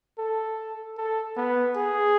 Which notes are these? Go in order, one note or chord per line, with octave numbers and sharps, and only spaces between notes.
A4
A4
B3
G#4